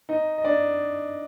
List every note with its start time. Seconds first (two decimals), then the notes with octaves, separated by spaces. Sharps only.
0.09 D#4 D#5
0.38 D#5
0.44 D4 D5